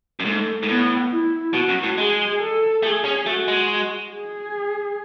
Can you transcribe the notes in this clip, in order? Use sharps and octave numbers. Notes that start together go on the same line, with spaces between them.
F#2
G#2 A3
G#2
A2 B3
E4
B2 F#4
F#2
A2
G#3 G#4
A4
A3 G#4
C#4
A3 F#4
G#3
G#4